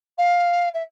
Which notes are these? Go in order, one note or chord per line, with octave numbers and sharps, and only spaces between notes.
F5
E5